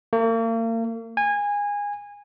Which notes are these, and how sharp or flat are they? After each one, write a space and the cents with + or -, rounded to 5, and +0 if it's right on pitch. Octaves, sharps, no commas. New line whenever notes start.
A#3 -40
G#5 -20